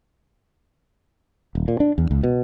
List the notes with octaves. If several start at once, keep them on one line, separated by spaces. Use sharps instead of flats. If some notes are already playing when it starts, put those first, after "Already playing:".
D#1
A#2
D4
E2
C#2
B2